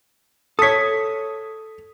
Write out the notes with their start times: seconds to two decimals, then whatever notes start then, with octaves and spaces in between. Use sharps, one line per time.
0.59 A4 C#5 D#6 B6